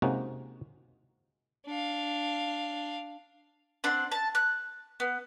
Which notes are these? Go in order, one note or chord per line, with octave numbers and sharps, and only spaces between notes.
C3 G#3 A#3 C#4 D#4 F#4
D4 F5
C4 D4 F#5 C6
A5
F#6
B3